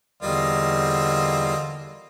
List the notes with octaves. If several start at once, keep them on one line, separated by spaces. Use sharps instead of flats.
E2 D3 G3 A#3 C4 F4 D#5